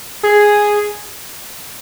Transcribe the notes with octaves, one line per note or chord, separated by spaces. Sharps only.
G#4